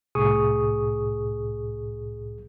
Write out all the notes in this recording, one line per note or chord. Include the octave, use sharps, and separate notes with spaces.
C2 A2 G#4 C#6 D#6